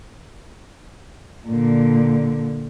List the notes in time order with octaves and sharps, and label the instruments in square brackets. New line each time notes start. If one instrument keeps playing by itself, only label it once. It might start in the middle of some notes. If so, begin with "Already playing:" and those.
[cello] A#2 D3